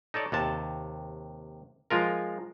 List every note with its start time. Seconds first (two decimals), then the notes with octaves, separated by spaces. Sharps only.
0.14 D#4 A4 C#5 D5
0.32 D#2 C3 A5
1.90 F3 G#3 F4 A#4